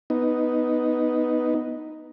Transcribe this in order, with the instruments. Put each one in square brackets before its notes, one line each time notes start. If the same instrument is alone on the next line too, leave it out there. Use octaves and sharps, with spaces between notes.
[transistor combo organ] B3 D#4